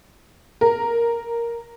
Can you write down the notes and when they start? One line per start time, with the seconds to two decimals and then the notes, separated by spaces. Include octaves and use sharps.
0.61 A#4